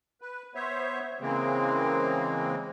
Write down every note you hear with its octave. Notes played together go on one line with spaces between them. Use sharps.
B4
B3 C5 C#5 E5
C#3 E3 G#3 A#3 C4